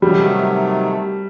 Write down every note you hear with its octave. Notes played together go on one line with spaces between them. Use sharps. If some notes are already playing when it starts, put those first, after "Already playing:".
C3 D#3 F#3 G3 A3